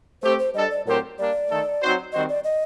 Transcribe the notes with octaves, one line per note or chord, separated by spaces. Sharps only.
A3 C4 G4 C5
C5
G3 D4 A4 D#5
D5
A2 F#3 C4 G4 A#4 C5
G3 A#3 D4 D5
D#3 A3 D#4 A4
F#3 C4 D#4 F#4 C5
D#3 G3 C4 F#4 C5 D#5
D5
D#5